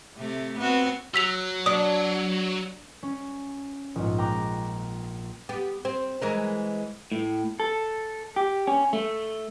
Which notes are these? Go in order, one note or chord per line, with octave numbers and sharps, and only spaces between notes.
C3 A3
B3 C4 F#4
F#3 E6 B6 F7
D4 D#6
C#4
A#1 G#2
G5 A#5 D6 F#6
B3 G4
C4
E3 G#3 A#4
A2
A4
G4
C#4
A3